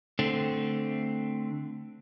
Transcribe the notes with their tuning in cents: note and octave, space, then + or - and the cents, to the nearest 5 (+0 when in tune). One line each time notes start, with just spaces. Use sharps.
D3 +0 A3 +0 C4 +0